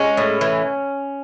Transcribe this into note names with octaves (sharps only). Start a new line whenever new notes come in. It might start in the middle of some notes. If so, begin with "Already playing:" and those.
Already playing: G#3 C#4
A2
E3